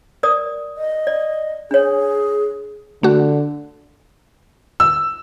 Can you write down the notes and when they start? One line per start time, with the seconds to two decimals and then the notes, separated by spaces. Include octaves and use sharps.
0.23 A#4 D5 D#6
0.77 D#5
1.07 D5
1.71 D4 G#4 C#5
3.03 D3 A3 F#4
4.80 E6